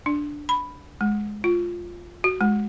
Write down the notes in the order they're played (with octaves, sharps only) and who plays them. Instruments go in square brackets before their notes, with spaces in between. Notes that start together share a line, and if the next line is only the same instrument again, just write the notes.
[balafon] D4
B5
G#3
F4
F#4
G#3